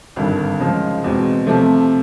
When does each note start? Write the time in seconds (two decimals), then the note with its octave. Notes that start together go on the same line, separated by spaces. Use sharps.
0.16 G#1 G2 D3
0.60 C#3 F3 G#3
1.04 E2 B2 G#3 C4
1.47 C3 F3 A3